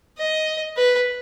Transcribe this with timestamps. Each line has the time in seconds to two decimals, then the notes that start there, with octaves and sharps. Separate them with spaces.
0.18 D#5
0.77 B4